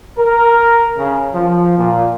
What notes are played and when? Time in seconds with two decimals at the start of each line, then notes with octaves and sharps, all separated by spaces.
0.17 A#4
0.97 C#3
1.34 F3
1.77 A#2